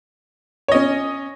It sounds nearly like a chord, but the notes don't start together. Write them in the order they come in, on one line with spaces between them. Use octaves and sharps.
C#5 D#5 C#4